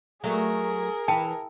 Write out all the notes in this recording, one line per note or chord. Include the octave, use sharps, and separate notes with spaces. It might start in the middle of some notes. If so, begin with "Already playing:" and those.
F#3 A3 G#4 A#4
E3 G5 A5